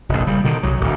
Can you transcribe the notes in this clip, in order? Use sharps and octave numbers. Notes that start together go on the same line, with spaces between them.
F1 A#1
C#3 G3
B2 D3 D#3
C2 F#3
D1 D2